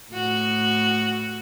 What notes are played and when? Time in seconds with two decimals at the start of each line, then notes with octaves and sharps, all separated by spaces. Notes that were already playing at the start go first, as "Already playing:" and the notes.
0.11 A2 F#4